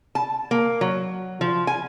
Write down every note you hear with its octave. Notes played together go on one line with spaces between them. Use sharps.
A5
A#3
F#3
F3
G#5